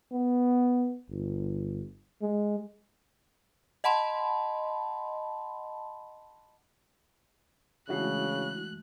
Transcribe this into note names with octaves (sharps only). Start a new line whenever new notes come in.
B3
G1
G#3
D#5 F#5 A5 B5 C6
C#3 E3 G#3 A3 D4 E4 F#4 F#6